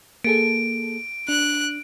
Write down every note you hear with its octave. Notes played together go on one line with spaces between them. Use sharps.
A#3 G#4 A4 D7
D4 F#6